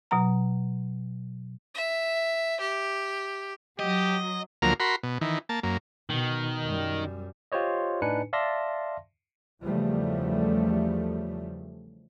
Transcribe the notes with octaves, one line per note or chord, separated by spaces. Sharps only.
B2 F#3 A#5
E5
G4
F#3 G4 D#5
D2 F3 F#3 A#3 A#4 F6
F#4 A#4 B5 C6
B2
D#3 E3
A#3 A5
F#2 A#3
B2 D#3
F#2 G3
F4 G4 C5 C#5 D#5
A2 D4 D#4 B4 G#5 C#7
D5 E5 F5 A5 C6 A#6
E2 C#3 F3 G3 A3